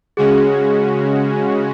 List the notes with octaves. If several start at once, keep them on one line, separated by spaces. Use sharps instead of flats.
C#3 G#3 C#4 F#4 G#4